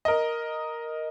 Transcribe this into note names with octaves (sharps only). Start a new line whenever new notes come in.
A#4 D#5